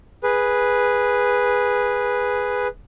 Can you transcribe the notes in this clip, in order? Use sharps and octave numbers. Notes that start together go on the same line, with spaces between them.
G#4 B4